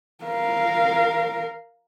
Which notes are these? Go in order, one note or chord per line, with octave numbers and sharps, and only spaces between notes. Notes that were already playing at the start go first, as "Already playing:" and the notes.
A#4 F5